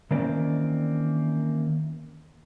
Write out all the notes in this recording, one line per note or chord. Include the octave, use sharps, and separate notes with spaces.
D#3 E3 A#3 C4 C#4 D5